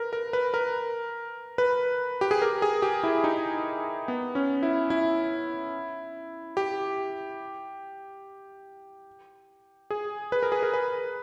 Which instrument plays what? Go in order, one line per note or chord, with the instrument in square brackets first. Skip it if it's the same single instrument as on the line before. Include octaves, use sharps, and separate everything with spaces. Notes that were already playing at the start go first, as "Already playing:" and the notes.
Already playing: [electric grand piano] A#4 B4
A#4
B4
A#4
B4
G4
G#4
A#4
G#4
G4
E4
D#4
B3
C#4
E4
E4
G4
G#4
B4
A#4
G#4
A#4
B4